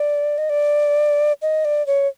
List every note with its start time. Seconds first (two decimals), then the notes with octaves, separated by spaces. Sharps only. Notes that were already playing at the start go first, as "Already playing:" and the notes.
Already playing: D5
0.38 D#5
0.50 D5
1.42 D#5
1.65 D5
1.87 C#5